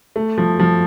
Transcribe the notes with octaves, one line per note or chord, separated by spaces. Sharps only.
A3
F3
F3